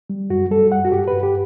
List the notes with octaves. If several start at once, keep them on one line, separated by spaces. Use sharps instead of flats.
G3
F#2 F#4
G3 A4
F#2 F#5
F#4
G2 G4
B4
G2
G4